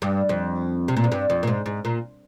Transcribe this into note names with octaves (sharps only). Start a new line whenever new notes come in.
G2
F2
C3
A#2
G#2
G2
F2
A#2
G#2
G#2
A#2